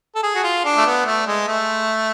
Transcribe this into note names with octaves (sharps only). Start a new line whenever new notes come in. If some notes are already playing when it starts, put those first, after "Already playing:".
A4
G#4
F#4
F4
D4
A3
B3
A3
G#3
A3